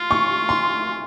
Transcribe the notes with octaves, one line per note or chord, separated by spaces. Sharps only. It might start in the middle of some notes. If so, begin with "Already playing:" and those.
Already playing: F4 C6
C#6
C6